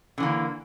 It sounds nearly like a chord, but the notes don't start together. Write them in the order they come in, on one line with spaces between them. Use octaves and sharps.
D3 E3 A#3